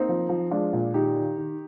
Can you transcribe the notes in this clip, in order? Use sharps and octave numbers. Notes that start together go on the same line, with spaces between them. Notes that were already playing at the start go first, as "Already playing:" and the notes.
Already playing: A#3 C4 D#4
F3
F3
G#3 D4 F4
A#2
D#3 D#4 G4
D#3
D#3